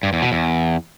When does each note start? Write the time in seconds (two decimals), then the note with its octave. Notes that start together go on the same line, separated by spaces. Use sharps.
0.03 G2
0.13 E2
0.22 B2
0.32 E2